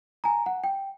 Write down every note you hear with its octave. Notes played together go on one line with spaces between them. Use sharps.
G#5 A#5
F#5
G5